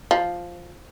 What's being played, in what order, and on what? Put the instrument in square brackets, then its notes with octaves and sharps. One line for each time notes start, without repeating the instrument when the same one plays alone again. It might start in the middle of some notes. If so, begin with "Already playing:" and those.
[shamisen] F3